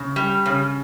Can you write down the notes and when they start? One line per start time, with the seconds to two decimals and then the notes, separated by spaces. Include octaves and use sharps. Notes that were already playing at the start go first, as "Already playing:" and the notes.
Already playing: C#3
0.16 G3
0.46 C#3